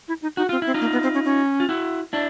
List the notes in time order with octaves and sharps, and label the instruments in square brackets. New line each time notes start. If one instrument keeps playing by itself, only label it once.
[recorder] E4
D#4
[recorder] D#4 [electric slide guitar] F#4
[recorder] C4 [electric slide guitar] F4
[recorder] C4 [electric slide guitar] E4
[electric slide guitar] D#4 F4
[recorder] A#3
B3
C4
C#4
C#4
[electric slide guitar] F4
E4 F#4
D4 E4